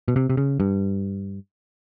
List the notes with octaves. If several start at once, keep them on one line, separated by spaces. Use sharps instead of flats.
B2
C3
C3
C#3
G2